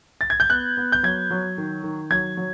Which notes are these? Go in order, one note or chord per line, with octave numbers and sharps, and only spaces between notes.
A6
G#6
G6
B3 F#6
B3
G6
F#3 G#6
F#3
D#3
D#3
F#3 G#6
F#3